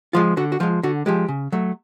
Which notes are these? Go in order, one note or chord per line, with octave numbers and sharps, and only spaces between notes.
F3 G#3 F4
D3 F#4
F#4
F3 G#3 F4
D3 F#4
F3 G#3 G4
C#3
F#3 A3